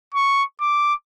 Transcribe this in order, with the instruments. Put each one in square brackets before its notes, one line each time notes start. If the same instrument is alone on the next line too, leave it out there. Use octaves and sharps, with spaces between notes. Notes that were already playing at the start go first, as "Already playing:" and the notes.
[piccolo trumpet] C#6
D6